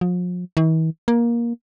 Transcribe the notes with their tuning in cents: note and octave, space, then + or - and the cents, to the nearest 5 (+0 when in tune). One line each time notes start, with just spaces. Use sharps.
F3 +40
E3 -45
A#3 +15